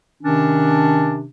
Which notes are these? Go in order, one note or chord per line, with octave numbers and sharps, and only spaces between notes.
C3 D#3 C#4 D4